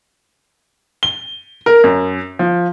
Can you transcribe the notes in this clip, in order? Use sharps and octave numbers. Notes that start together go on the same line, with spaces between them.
G7
A#4
F#2
F3